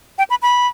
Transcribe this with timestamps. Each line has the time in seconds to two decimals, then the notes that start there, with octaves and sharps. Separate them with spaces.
0.18 G5
0.30 B5
0.42 B5